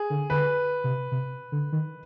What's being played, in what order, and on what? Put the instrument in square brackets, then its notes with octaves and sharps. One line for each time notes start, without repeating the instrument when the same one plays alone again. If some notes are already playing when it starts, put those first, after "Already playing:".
Already playing: [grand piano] G#4
[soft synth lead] D3
[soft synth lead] D3 [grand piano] B4
[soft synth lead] C3
C3
D3
D#3